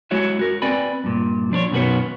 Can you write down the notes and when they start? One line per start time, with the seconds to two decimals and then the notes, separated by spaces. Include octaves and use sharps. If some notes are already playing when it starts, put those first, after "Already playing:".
0.11 G#3 E4 F#4 C#5 E5
0.39 F#4 A#4
0.62 C4 B4 D5 G#5 B5
1.04 G2 A#2
1.52 F3 D4 B4 C#5
1.71 F#2 B2 D#3 F#4 B4 C#5